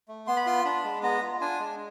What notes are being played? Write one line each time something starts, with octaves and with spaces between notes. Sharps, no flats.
A3
B3 C6
B5
F4 C6
D4 B5
G#3
B3 A#5
F4
D4 G#5
G#3